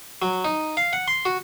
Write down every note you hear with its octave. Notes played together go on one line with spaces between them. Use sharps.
F#3
D#4
F5
F#5
C6
F#4